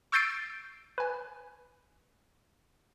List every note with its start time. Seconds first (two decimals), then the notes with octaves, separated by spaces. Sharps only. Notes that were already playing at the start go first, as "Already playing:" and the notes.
0.12 C#6 E6 G6 A6 C7 D7
0.98 B4 G#5